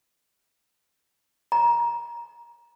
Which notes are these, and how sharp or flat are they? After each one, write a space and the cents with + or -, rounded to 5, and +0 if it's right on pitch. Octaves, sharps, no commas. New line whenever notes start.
A#5 +20